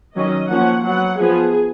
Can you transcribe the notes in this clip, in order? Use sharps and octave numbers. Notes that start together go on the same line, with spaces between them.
D#3 F#3 C#4 D#5
F3 A#3 C#4 F#5
F#3 B3 F#5
F3 B3 G#4